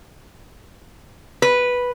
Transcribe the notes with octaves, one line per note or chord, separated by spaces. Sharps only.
B4